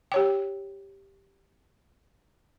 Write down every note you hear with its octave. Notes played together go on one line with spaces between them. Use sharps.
G4 C#5 G5